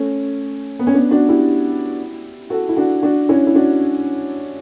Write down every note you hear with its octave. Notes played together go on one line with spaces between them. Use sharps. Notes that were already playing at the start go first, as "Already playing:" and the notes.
Already playing: A3 C#4
B3
C#4
B3 D4
D4 F#4
E4 G4
F#4 A4
E4
D4 F#4
D4 F#4
C#4 E4
E4
D4 F#4